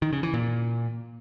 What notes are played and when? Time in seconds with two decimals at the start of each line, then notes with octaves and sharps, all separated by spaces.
0.02 D#3
0.13 C#3
0.23 E3
0.34 A#2